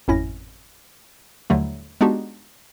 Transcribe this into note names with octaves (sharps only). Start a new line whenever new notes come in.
G#1 F2 A2 C#4 E4 A#6
D#2 A2 D3 F#3 G3 A3
G#3 B3 D4 D#4 F#4 G4